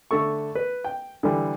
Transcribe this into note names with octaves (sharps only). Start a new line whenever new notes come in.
D3 A3 A4 C#6
B4
G5
D3 E3 G3